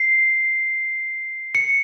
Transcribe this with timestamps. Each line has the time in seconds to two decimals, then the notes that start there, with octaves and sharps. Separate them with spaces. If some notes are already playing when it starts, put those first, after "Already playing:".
Already playing: C7
1.55 C#7